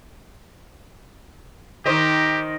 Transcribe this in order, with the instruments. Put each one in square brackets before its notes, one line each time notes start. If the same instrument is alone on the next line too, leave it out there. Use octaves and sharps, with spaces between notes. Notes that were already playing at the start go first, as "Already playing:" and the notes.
[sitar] D#3 C5 D#5 [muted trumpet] G4